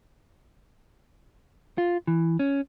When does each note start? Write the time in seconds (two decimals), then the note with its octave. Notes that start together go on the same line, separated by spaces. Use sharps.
1.78 F4
2.07 E3
2.39 C#4